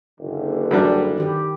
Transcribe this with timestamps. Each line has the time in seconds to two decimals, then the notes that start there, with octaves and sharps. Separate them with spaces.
0.20 F#1 D3
0.71 F#2 G3 D4
1.18 D#3 G4 B4